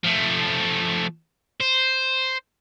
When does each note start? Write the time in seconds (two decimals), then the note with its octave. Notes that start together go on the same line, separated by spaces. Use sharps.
0.04 F3 A3
1.60 C5